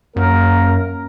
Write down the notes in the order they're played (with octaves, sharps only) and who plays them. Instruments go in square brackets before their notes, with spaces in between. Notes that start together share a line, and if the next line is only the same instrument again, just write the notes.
[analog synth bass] F#2 [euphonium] A#3 [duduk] A#4